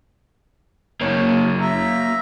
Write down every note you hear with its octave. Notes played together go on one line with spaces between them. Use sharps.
F#1 A#3 C#5
E5 A#5